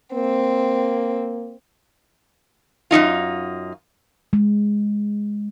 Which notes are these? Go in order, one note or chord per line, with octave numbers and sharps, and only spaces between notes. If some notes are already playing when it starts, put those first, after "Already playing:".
A#3 C4
F#2 D#3 D#4 F4
G#3